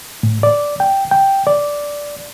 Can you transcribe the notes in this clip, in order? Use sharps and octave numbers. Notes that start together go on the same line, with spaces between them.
A2
D5
G5
G5
D5